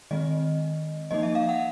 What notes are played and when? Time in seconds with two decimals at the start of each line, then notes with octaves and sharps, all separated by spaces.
0.11 D#3 G#3 C4 D#5
1.11 F3 A#3 D#4 D#5
1.23 E5
1.35 F5
1.49 F#5